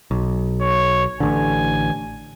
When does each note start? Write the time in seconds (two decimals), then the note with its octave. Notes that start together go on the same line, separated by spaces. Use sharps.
0.11 B1
0.61 C#5
1.20 A1 D3 G#5